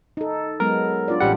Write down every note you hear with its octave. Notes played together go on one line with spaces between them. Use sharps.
D#4 A4
F#3 G#3 B3 A#4
D4 F4 D5
A1 G3 F#5